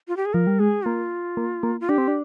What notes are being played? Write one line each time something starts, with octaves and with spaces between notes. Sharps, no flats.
F4
G4
G#4
F3 A#4
G3
G#3 G#4
A#3 F4
A#3
A#3
F4
D4 G4
C4
D4